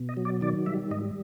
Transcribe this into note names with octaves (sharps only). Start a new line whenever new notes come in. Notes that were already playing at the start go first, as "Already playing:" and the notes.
Already playing: B2
D#5
F#3
D5
D#3 D5
G3 E5
G#2 D#5